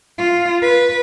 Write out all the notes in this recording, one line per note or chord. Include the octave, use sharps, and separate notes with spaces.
F4
B4